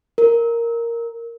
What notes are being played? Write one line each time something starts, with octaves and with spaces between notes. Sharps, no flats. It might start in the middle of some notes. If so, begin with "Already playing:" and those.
A#4